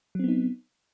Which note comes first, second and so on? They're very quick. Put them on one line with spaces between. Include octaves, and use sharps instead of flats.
F#3 C4 B3 D#4